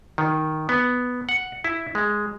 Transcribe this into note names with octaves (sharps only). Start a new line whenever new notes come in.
D#3
B3
F#5
E4
G#3